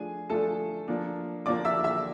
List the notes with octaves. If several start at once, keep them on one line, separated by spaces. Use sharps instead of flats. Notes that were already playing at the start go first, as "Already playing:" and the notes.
Already playing: F3 A3 D4 F4 G#4 G#5
F3 A3 D4 F4 A4 A5
F3 A#3 D4
F3 A#3 D4 D5 D6
E5 E6
E5 E6